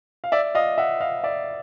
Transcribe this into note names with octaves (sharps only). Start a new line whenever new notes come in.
F5
D5 E5
D#5 F5
E5 F#5
D#5 F5
D5 E5